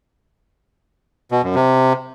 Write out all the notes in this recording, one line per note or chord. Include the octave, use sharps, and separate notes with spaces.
B2
F#2
C3